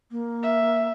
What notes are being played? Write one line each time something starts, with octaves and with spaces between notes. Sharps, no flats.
A#3
E5